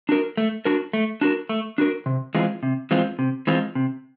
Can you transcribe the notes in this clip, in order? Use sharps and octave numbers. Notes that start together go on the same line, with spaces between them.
D4 F#4 A#4
A3
D4 F#4 A#4
A3
D4 F#4 A#4
A3
D4 F#4 A#4
C3
E3 G#3 C4 F4
C3
E3 G#3 C4 F4
C3
E3 G#3 C4 F4
C3